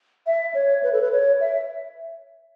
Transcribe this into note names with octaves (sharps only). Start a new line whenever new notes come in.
E5
C#5
B4
A4
B4
C#5
E5